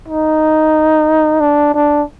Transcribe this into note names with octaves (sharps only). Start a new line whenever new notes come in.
D#4
D4
D4